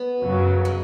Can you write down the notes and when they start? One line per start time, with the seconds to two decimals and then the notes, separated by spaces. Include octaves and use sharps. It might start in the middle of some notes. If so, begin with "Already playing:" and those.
Already playing: B3
0.22 F#2 C#3 F#3
0.65 G#3